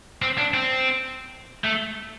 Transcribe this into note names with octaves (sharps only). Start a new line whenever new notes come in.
C4
D4
C4
A3